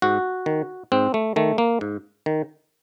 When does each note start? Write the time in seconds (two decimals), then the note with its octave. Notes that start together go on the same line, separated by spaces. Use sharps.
0.02 G#2 F#4
0.46 D#3
0.92 G#2 C4
1.14 A3
1.36 D#3 A3
1.58 A#3
1.81 G#2
2.26 D#3